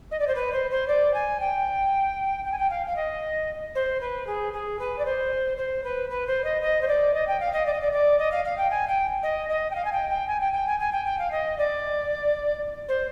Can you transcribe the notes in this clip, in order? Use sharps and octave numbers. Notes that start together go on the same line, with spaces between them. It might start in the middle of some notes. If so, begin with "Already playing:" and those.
D#5
D5
C5
B4
C5
C5
D5
G#5
G5
G5
G#5
G5
F5
F5
D#5
C5
B4
G#4
G#4
B4
D5
C5
C5
B4
B4
C5
D#5
D#5
C5
D5
D#5
G5
F5
D#5
D5
D#5
D5
D5
D#5
F5
F5
G5
G#5
G5
D#5
D#5
G5
F5
G#5
G5
G5
G#5
G5
G5
G#5
G#5
G5
G5
F5
D#5
D5
C5